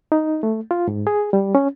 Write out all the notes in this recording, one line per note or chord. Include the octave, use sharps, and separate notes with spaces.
D#4
A3
F4
G#2
G#4
G3
C#4